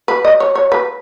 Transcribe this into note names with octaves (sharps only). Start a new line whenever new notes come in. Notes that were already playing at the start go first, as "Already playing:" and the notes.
B4
D#5
C#5
C#5
B4